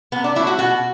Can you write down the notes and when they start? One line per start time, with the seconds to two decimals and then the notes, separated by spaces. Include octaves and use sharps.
0.12 C3 B3
0.24 D4
0.36 F#3 E4
0.39 A3
0.47 F#4
0.58 B2 F#4